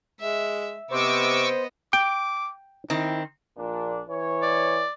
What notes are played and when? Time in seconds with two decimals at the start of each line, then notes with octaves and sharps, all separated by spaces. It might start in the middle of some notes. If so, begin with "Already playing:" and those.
0.21 G#3 E5
0.91 C3 B3 C5 D#5 C#6 D6 E6
1.93 G5 D6
2.90 D#3 C4 E4
3.58 A#1 A#2 D4
4.09 E3 C#5
4.42 D5